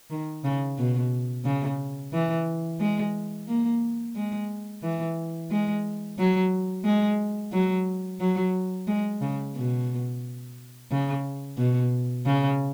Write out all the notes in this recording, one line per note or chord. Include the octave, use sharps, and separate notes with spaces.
D#3
C#3
B2
C#3
E3
G#3
A#3
G#3
E3
G#3
F#3
G#3
F#3
F#3
G#3
C#3
B2
C#3
B2
C#3